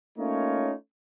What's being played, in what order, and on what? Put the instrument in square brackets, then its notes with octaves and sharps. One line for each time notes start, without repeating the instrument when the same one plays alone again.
[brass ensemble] A3 A#3 C#4 D#4 F4 C#5